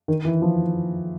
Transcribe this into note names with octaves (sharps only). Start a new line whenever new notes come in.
D#3
E3
F3